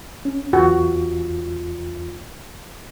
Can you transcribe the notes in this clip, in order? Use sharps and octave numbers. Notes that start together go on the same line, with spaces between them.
C#4
E2 F4 F#4